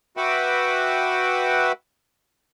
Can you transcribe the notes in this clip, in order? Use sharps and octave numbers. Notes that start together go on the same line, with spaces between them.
F#4 B4 E5 F#5 G5 D6